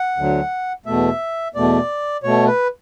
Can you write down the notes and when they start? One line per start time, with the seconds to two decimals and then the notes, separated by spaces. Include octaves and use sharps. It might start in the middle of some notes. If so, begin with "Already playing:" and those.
Already playing: F#5
0.17 D2 D3 F#3
0.86 E2 B2 A3 E5
1.54 E2 B2 A3 D5
2.23 B2 A3 C#5
2.47 B4